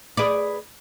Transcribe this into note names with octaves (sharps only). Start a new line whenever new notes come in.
G#4 B4 D5